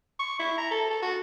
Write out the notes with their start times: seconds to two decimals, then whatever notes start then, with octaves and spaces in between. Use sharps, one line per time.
0.20 C#6
0.39 E4
0.58 A#5
0.71 A4
0.90 A4
1.02 F#4